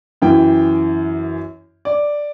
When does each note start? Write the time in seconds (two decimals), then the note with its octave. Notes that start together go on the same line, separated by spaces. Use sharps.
0.22 F#2 E3 G5
1.85 D5